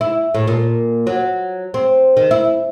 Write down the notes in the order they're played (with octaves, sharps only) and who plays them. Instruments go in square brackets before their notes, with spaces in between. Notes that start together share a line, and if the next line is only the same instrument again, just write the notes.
[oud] E4
A2
A#2
F#3
C4
D#3
E4